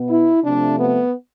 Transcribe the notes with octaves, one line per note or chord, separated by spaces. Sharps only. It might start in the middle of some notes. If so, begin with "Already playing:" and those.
Already playing: B2 B3
E4
C3 F3 A3 D4
B3